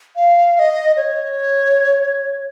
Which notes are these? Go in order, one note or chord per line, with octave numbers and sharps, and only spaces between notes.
F5
F5
D#5
C#5